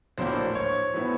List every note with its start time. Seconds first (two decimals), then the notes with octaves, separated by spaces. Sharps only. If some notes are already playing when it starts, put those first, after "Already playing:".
0.18 A#1 A2 F#3 A#3 D4 C5
0.55 C#5
0.93 A2 F#3 B3 E4